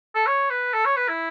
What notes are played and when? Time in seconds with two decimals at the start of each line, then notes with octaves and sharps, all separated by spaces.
0.15 A4
0.27 C#5
0.50 B4
0.73 A4
0.85 C#5
0.96 B4
1.08 E4